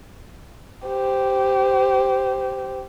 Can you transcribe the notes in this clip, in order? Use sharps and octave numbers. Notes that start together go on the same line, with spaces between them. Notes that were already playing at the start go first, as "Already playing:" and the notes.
G4 C5